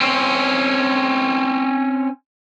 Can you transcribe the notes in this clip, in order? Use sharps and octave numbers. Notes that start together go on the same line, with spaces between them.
C4 C#4